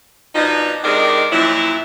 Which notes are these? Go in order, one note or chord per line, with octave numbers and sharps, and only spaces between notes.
B2 F3 D4 D#4
C3 D#3 G#3 D4 D#4 A#4
F#2 A#2 F3 F#3 E4